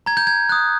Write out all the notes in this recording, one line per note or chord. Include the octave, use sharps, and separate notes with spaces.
A#5 G#6
G6
G#6
D#6 F#6